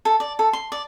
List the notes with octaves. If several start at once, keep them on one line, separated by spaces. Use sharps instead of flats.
A4
D5
A4
C6
D5